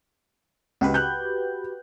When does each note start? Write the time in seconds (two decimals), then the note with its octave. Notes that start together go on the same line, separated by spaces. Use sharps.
0.81 C#2 F#4 G4 B4
0.94 F#6 G6